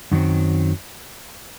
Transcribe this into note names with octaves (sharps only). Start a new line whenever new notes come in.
F#2 D#3 F#3 C4